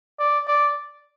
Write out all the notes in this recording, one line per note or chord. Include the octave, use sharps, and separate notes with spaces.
D5
D5